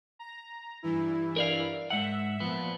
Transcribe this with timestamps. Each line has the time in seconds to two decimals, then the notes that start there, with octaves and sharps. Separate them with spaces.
0.19 A#5
0.83 G2 E3 E4
1.36 A#4 D5 F5
1.90 G#2 E5 F#5
2.40 A#2 F3 B3